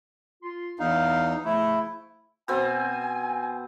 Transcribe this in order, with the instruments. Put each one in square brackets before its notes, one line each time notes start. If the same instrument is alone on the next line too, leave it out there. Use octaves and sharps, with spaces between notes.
[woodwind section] F4 C6
[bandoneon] E2 D#4 [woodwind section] F5
[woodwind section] C#3 F3 A3 [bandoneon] E4
[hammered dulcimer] B2 C4 [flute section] G#5